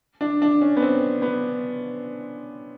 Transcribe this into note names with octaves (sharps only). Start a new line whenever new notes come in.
D4
D4
C#4
B3
C4
B3